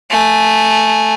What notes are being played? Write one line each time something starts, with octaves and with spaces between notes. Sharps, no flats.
A3 G#5